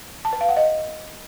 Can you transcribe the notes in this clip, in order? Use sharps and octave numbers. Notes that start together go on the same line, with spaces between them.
A5
B4
F5
F#5
D#5